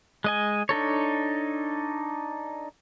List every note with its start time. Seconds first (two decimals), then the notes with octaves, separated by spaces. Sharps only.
0.24 G#3 D#5 G#5
0.69 D4 D#4 A4 C#5